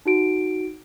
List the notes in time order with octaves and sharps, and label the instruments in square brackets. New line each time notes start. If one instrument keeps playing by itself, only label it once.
[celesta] D#4 F#4 D7